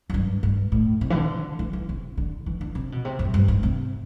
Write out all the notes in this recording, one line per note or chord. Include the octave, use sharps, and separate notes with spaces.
F#2
G2
G2
A2
C3
E3
D3
E3
E3
C3
D3
E3
D3
C3
B2
C3
F#2
G2
G2
C3